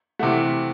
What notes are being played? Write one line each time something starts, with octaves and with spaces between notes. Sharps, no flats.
C3 E3 A3 F#5